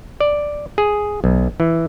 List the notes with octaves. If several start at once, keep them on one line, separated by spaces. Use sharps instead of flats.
D5
G#4
B1
E3